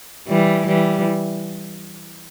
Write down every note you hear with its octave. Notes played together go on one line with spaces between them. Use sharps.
E3 G3
E3 G3